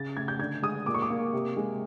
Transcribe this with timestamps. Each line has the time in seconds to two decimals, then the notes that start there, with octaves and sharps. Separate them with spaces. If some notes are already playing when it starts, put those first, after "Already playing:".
Already playing: C#3 A6
0.17 A3 G#6
0.28 G6
0.39 D3 G#6
0.63 G#3 D#6
0.86 A#2 D6
0.94 C#6
1.02 D6
1.10 A#3
1.33 C3
1.57 G#3